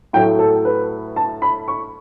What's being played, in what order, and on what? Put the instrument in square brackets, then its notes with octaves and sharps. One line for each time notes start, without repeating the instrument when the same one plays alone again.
[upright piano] A2 F#3 A3 G5
A4
B4
A5
B5
C#6